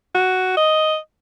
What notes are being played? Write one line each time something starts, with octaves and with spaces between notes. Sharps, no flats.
F#4
D#5